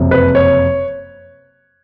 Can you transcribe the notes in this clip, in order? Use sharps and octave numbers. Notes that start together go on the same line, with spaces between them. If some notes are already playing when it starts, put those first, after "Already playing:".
Already playing: F#1 F2 C3
B4
C#5